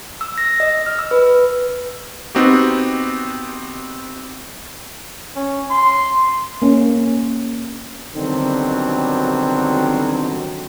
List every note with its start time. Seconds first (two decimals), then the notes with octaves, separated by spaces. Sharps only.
0.21 E6
0.38 A#6
0.60 D#5
0.86 F6
0.99 E6
1.11 B4
2.35 B3 C4 D#4 F#4 G4
5.36 C#4
5.70 C6
6.62 A#3 C#4
8.15 B2 D3 D#3 F#3 G3 C4